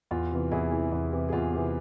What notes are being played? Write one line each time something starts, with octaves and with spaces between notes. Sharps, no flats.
E2 F4
C3 E3
E2 E4 G#4
C3 E3
E2
C3 E3
G#4
E2 F4
C3 E3